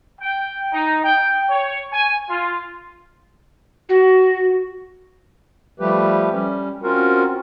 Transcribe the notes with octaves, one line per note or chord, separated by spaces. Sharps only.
G5
D#4
G5
C#5
G#5
F4
F#4
F3 G3 A3 G4 B4
G3 C#4
C4 C#4 F4 F#4 A#4